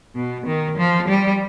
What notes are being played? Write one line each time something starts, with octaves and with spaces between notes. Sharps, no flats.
B2
D#3
F3
G3